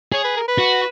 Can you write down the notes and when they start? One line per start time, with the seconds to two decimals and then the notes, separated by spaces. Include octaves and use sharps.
0.12 G#4 C#5
0.24 B4
0.37 A#4
0.48 B4
0.58 F#4